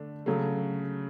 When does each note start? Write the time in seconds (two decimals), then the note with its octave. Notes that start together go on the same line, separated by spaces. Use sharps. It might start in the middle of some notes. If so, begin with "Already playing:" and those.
Already playing: D3 A3 D4
0.26 C#3 F#3 A3